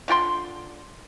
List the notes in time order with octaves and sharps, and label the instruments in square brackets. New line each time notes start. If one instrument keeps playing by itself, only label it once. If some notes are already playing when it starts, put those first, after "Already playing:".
[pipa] D3 F4 G5 C6